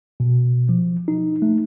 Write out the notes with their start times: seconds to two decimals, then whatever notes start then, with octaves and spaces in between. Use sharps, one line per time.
0.20 B2
0.69 F3
1.08 D#4
1.42 A3